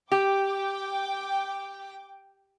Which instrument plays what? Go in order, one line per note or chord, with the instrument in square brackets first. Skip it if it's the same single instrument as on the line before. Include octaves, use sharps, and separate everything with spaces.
[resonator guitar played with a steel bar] G4 [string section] G5 D6